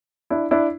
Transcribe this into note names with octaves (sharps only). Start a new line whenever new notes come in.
D4 E4
D4 E4